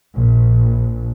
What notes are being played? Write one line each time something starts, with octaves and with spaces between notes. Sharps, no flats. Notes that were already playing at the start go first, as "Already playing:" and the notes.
A#1